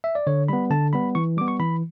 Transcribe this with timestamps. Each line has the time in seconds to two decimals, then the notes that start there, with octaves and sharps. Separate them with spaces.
0.04 E5
0.15 D5
0.27 D3 C#5
0.48 G3 B3 B5
0.71 D3 A5
0.93 G3 B3 B5
1.15 E3 C#6
1.37 G3 D6
1.41 B3
1.48 C#6
1.60 E3 B5